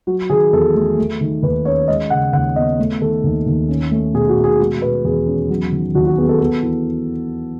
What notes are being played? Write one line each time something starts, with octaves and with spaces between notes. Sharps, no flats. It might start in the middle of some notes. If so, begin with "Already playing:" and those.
F#3 F#4
D#3 G#4
E2 A4
A3
A3
D#3
D#2 B4
C#4 C#5
G#3 D#5
C#3 F#5
D#2 F#5
B3 D#5
A3
D#3 A4
D#2
D#2
C#4
A3
B2 G#4
F#4
B2
G#4
G#3 F#4
B2 B4
E2 G#4
C#4
F#3
D#3
D#2 F#4
F#4
B3 G#4
A4
B3 A4
E3